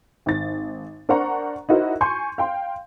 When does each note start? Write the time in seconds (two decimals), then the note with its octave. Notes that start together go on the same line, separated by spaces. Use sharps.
0.26 G#1 A6
1.09 D4 A#4 C5 F#5 A#5 C#6
1.69 D#4 E4 F#4 A#4 C5
2.01 G#5 C6 C#6 G6
2.38 F5 G5 C6